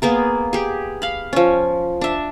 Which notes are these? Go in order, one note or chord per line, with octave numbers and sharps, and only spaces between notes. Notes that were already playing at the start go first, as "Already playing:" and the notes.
A#3 B3 G#4 A#4
G4 G#4
F5 B5
F3 C#4
D4 E5